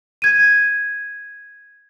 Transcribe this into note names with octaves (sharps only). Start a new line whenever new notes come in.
G#6 D#7